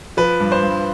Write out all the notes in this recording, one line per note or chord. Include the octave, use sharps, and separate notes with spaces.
F3 B4
G2
C5
G2